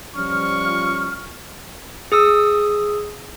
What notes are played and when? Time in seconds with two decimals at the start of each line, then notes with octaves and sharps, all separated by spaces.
0.16 F3 G3 C#4 F4 C#6 F6
2.12 G#4 D#6 E6